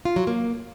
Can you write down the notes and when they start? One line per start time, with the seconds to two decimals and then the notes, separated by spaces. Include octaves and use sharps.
0.05 F4
0.16 F#3
0.27 A#3